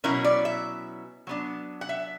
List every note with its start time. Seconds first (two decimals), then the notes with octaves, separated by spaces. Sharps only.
0.04 B2 F#3 C#4 E4 A#4
0.24 D5
0.45 E5
1.27 F#3 B3 D4
1.81 F#5
1.89 E5